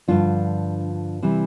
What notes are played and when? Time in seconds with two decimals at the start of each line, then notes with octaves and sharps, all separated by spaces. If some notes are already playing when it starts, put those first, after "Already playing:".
0.08 G2 D3 F3 D4 F4
1.23 C3 E3 G3